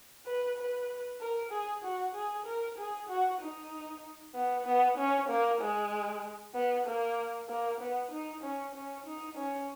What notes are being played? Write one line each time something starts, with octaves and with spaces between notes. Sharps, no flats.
B4
B4
A#4
G#4
F#4
G#4
A#4
G#4
F#4
D#4
B3
B3
C#4
A#3
G#3
B3
A#3
A#3
B3
D#4
C#4
C#4
D#4
C#4